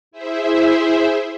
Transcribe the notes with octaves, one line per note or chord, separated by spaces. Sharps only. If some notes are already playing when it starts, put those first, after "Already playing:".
E4 G#4 C5 E5